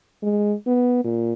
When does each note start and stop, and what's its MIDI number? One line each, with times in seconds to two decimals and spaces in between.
0.22 0.54 56
0.66 1.00 59
1.04 1.33 46